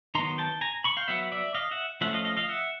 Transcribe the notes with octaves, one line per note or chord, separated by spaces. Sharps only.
D#3 F#3 B3 A#5 C6
G5 A5
G#5 A#5
B5 C#6
F5 G5
F#3 B3 E5 F#5
D5 E5
D#5 F5
E5 F#5
F3 A3 C#4 E5 F#5
D#5 F5
D#5 F5
D#5 F5
E5 F#5